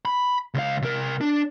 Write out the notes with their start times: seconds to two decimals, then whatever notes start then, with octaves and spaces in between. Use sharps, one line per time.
0.05 B5
0.54 C#2 F5
0.82 C3 A#4
1.21 D4